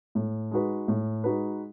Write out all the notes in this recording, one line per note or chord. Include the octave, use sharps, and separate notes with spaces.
A2
G#3 D#4 F#4 B4
A2
G#3 D#4 F#4 B4